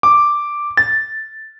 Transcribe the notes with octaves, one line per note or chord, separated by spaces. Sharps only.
D6
A6